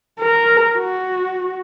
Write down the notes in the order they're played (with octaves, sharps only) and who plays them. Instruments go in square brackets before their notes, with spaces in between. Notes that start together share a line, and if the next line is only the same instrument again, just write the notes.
[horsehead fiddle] A#4
F#4